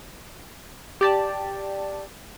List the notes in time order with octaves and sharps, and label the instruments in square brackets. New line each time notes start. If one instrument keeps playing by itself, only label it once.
[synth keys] G4 D5 A5